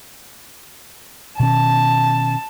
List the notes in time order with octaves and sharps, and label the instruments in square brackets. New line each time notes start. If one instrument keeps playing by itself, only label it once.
[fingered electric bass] B2 D#3 C#4 [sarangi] A5